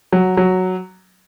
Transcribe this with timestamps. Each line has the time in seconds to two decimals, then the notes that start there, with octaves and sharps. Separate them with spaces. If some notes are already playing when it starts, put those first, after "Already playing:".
0.12 F#3
0.37 F#3